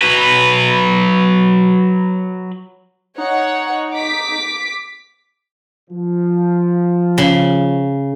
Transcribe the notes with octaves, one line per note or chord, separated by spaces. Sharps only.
F#3 B4
D#4 C#5 F#5
D6 B6
F3
C#3